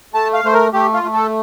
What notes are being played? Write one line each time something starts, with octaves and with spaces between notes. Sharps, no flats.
A3 A5
F5
A3 C5
A#4
A3 G4
F4
A3
A4